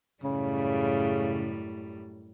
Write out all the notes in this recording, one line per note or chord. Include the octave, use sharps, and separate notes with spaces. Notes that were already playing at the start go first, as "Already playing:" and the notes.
F#2 A2 C#3 G3